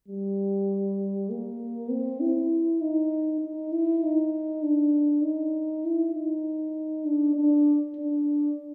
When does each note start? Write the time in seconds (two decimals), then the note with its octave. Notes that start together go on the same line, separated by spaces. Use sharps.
0.08 G3
1.30 A#3
1.91 C4
2.21 E4
2.81 D#4
3.42 D#4
3.72 E4
4.03 D#4
4.63 D4
5.23 D#4
5.85 E4
6.15 D#4
7.06 D4
7.36 D4
7.96 D4